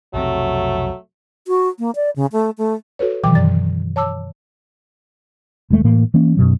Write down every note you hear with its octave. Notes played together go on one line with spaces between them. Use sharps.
B1 F2 C3 F#3 A3
F#4
A#3
D5
C#3
A3
A3
F#4 A4 B4 C#5
B2 D#3 E3 F#3 G5 D6
F#2 D3 D5 A6
C#5 A5 D6 E6
E1 D#2 G#3 A3
A2 E3 A#3
E3 A#3 C#4
F#2 B2 F#3